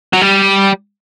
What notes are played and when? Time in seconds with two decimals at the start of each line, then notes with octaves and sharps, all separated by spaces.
0.13 F#3
0.22 G3